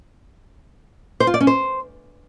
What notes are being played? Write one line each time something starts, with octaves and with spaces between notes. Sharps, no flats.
C5
F4
D5
C#4
C5